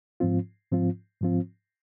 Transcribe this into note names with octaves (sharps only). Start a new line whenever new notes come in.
G#2 F3 C4 F4
G#2 F3 C4 F4
G#2 F3 C4 F4